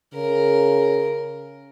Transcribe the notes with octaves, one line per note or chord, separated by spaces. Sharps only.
C#3 A#4